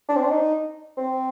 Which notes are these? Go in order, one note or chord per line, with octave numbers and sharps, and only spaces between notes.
D4
C4
D4
D#4
C4